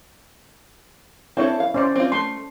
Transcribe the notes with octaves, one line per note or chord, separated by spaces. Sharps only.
C4 D4 E4 A4 C#5
F5
C#4 C5 D5
C4 F4
A3 C6